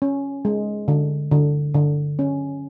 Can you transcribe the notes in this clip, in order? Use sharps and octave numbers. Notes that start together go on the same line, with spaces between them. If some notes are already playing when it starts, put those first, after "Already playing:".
C#4
G#3
D3
D3
D3
C#4